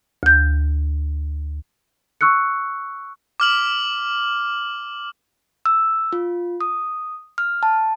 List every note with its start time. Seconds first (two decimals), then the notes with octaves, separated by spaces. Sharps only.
0.23 D2 G6
2.21 C#6 E6 F#6 C#7
3.40 D6 F6 F#7
5.66 E6
6.13 F4
6.61 D#6
7.38 F6
7.63 A5